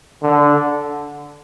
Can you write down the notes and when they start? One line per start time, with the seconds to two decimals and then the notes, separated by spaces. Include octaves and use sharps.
0.22 D3